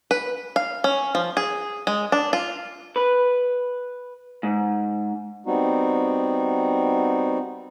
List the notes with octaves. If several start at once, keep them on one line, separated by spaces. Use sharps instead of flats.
B4
F5
C#4
F3
G#4
G#3
D4
F4
B4
G#2
G3 B3 C4 D#4 F#4